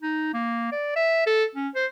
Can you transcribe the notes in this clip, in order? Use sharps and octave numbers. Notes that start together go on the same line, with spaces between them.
D#4
A#3
D5
E5
A4
C#4
C5